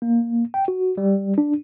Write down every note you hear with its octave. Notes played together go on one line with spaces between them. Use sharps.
A#3
G5
F#4
G3
D4